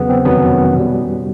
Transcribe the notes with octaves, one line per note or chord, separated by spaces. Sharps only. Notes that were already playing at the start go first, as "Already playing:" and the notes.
Already playing: E2 C#3 F#3 B3
C4
F2 C3 D#3 F#3 B3 C#4
B2
G3